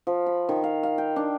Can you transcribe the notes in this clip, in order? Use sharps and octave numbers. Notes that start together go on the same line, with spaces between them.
F3
B5
D#3
F5
F5
G5
D4